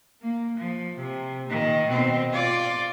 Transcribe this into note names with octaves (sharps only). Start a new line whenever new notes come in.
A#3
F3
C3
A#2 D#3
B2 C4
F4 D5